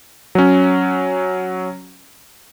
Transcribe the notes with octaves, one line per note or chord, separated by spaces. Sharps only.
F#3 C#4